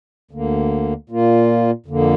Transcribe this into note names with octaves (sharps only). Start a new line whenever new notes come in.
D2 D3 A#3
A#2 A#3 F4
F2 D3 A#3